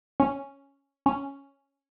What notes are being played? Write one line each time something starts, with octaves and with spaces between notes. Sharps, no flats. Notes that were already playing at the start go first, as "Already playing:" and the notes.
C#4
C#4